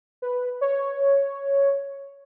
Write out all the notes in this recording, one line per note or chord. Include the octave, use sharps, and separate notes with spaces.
B4
C#5